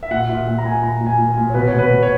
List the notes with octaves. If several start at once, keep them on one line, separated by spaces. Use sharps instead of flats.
E5
A#2 F#5
A#2 E5
A#2 F#5
A#5
A#2 G#5
A#2 A#5
A#2
G#5
A#2
G#5
A#2
C#5
B2 B4
C#5
B2
B4
B2
C#5